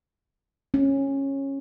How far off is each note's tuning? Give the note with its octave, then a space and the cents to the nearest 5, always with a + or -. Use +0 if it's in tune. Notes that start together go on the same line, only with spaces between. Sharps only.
C#4 -15